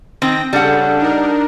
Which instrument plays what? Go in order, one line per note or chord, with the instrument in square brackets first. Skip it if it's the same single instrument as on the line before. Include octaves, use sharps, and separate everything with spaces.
[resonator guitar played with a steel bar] D#3 C4 [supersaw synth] G5 A#6
[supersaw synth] C#3 D4 A4 [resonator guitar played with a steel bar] G3 F#5
[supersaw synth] D4 D#4 A#4